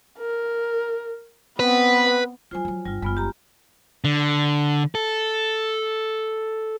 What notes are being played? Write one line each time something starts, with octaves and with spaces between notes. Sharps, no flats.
A#4
B3 C4 B4
F#3 E4 F4 C5 G#5
F3 F#3
G1 G3 F4
F#1 G#3 B3 F4
G4 A#5
D3
A4